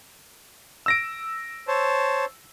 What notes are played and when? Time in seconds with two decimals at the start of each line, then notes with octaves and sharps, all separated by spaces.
0.86 E6 A#6 D7
1.68 C5 C#5 A5